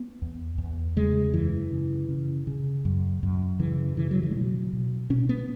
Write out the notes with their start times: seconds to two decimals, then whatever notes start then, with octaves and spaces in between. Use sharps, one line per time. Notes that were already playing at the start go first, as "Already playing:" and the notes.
Already playing: B3
0.22 E2
0.58 E2
0.96 C#3 G#3
1.34 F#2 E3
1.72 C#3
2.09 C#3
2.47 C#3
2.85 F#2
3.23 F#2
3.59 C#3 E3
3.97 C#3 E3
4.11 F#3
4.23 E3
4.31 G#3
4.36 B2 F#3
4.73 B2
5.10 B2 C#4
5.29 B3